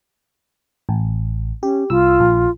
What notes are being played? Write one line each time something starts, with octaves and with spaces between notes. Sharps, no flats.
A1
C#4 G4
C2 F4 E6
A#1